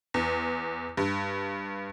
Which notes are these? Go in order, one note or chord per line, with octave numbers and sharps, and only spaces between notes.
E2
G2